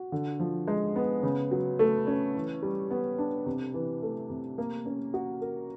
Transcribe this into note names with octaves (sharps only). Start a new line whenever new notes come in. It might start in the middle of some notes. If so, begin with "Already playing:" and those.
Already playing: F#4
D3
F3
G#3
B3
C#3
F#3
A3
C#4
E3
G3
B3
D4
C3
E3
A3
C3
A#3
C#4
F#4
A#4